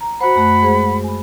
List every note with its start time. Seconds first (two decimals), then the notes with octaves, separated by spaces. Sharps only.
0.01 A#5
0.21 F#4 C5 F#5 B5
0.36 F#2 A3 F#6
0.62 G#3 G#4 C5
1.04 G#5 B5